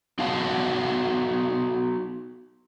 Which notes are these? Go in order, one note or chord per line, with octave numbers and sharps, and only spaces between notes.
B3 D#4 F#4 F5 F#5 A5